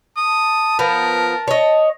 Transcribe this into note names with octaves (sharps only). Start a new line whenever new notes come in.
A5 D#6
F3 B3 A#4
C#5 D#5